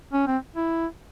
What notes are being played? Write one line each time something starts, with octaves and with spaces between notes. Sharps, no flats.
C#4
C4
E4